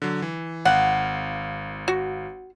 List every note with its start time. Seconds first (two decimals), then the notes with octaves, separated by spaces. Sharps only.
0.02 D3 F#3
0.22 E3
0.65 G#1 F5 F#5
1.88 F#4